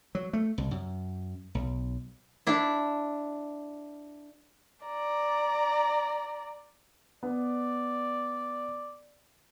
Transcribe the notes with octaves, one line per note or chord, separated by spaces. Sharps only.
F#3
A3
C2
F#2
B1
D4 E4
D5 A#5
B3 D5